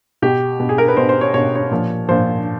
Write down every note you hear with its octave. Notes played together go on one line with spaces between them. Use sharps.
B2 G4
B2
G#4
A#4
B4
B2 C5
C5
C#5
B2 C#5
C#5
A#2 F3
A#2 F3 C5